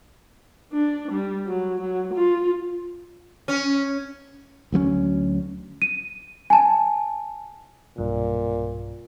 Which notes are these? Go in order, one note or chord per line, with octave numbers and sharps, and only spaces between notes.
D4
G3
F#3
F#3
F4
C#4
D2 F#3 G3 C#4
D#7
G#5 A5
B1 G2 A#2